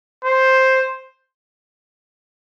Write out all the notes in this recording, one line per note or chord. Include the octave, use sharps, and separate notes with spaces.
C5